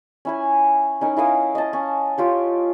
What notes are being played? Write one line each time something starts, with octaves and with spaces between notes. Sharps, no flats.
C#4 E4 G#5
C#4 D#4 A#4
E4 A#4 F5 D#6
D#5 A5
C#4
F4 G4 C#5